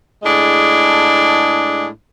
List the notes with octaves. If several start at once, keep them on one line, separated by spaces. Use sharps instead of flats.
A2 G#3 D4 G#4